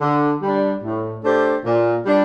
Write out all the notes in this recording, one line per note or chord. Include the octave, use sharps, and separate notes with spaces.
D3
G3 D4
A2
A3 D4 G4 C5
A#2
G3 D4